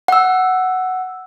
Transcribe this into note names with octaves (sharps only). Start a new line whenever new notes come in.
F#5 E6